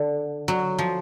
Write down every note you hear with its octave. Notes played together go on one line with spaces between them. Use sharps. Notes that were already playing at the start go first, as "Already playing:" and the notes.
Already playing: D3
F#3
F3